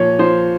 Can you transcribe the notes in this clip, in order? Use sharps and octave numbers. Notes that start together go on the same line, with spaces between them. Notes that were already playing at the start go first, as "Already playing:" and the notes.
Already playing: A#2 F3 C#5
F3 C5